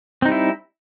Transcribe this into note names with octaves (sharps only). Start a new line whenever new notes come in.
G3 C4 D#4 E4